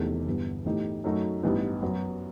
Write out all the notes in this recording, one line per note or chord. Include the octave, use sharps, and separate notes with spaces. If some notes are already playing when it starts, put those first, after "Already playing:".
Already playing: E1 E2 C3 D#3 A3
G1 G2 E3 B3
A2 E3 A3 D#4 G4
F#2 F#3 A3 D#4 F#4
A1 G2 E3 B3 D#4
F#2 F#3 B3 F#4